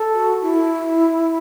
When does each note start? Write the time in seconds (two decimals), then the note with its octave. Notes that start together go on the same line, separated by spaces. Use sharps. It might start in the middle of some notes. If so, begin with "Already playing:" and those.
Already playing: A4
0.14 F#4
0.42 E4